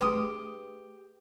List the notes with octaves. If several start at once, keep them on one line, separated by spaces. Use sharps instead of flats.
A3 D4 G4 G#4 B4 C6 D#6